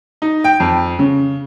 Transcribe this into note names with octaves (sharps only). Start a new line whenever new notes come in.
D#4
G5
F2
C#3